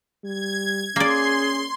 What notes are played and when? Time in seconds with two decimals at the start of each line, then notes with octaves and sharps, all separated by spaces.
0.24 G3 G#6
0.96 A#3 C#4 G#4 D5 C6